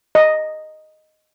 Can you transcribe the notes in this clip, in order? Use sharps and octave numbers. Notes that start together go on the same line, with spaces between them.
D#5